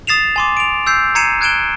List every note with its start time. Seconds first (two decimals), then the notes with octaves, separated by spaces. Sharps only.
0.07 D#6 A6 C7 E7 F7
0.36 G#5 C6 D6
0.57 D7 F7
0.86 E6 G6 C7
1.15 A#5 G#6 C7 C#7 D#7 E7
1.41 F#6 G#6 D7 E7 G7